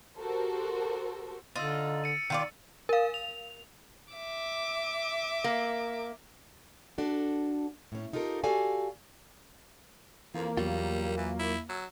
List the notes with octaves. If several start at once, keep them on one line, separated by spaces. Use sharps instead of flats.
F#4 G4 A4 A#4 C5
D3 D#4 F4 E6 A6
A6 C#7 D#7
D#3 F4 D5
A#4 F5
F7
E5 D6
A#3
D4 F#4 A4
A2 C#4
D#4 F4 G4 A4 A#4
F#4 G4 A4 D5 F5 G#5
F2 E3 A#3
E2 F#3 G3 F4
E3
E4
F#3 E6